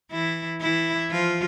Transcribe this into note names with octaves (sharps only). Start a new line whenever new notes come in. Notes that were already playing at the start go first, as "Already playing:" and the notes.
E3 E4
E3 E4
F3 F4